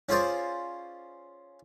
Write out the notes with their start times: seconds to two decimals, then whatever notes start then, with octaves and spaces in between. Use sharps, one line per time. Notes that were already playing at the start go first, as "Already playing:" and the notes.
0.09 C#4 F4 G#4 C5 D5